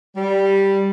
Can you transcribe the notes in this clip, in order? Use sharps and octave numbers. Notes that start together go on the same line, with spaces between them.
G3